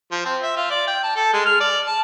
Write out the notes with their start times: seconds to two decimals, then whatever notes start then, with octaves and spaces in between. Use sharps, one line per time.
0.12 F3
0.25 C4
0.42 E5
0.57 F4
0.71 D5
0.87 G5
1.03 A5
1.16 A4
1.33 G#3
1.45 F6
1.60 D5
1.87 A5